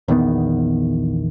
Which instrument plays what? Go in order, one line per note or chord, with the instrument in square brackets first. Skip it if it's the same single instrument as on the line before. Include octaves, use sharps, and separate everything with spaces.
[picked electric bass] A#1 E2 D#3 B3